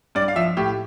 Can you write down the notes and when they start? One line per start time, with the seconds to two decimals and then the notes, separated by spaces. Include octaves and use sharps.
0.15 G2 D5
0.28 F5
0.36 F3 E5
0.57 A2 G4